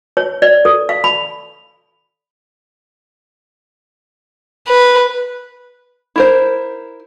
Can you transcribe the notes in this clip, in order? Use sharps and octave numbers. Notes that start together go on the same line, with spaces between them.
C#5
D5
A4
F5
B5
B4
E4 A#4 C5